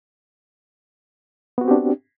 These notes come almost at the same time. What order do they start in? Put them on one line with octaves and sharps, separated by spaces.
B3 F#4 C4 G4 D4